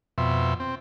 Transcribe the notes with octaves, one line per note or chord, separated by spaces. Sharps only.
F2 B2 E5 C6
C4